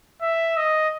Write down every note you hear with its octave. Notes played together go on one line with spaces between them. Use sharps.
E5
D#5